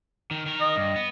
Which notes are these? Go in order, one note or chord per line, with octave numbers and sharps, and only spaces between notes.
D#3
D#3 A#4
D#5
G2
B3